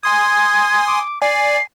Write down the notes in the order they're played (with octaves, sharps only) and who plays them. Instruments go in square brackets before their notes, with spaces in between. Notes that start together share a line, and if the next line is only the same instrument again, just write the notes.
[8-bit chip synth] G#5 C6 D#6 [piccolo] G#6
[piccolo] D6
[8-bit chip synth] D5 G#5 [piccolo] C7